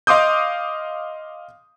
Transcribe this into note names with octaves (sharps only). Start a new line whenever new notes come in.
D#5 F5 C6 D6 D#6 G6